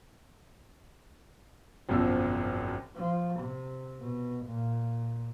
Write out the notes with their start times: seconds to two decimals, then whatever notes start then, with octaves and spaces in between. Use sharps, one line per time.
1.89 G#1 F#2 B2 F3 E6
2.96 F3
3.40 C3
4.01 B2
4.46 A#2